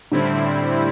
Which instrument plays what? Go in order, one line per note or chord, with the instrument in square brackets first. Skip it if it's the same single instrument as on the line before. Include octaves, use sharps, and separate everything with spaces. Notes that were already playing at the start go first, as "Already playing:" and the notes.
[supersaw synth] A2 G3 C4 E4 [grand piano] D3